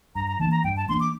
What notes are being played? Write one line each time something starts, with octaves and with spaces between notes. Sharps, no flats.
G2 A#5
A#5
E3 A#3 D4 A5
A#5
G2 G5
A5
E3 A#3 D4 C6
D6